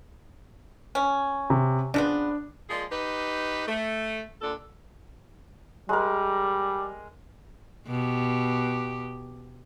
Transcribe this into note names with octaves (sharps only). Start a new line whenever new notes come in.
C#4
C3
C#3 F3 B3 D4
F3 G#3 A#3 G#4 D5
D#4 G4 B4
A3
A#2 D3 D4 A4
G3 G#3 A#4
B2 G4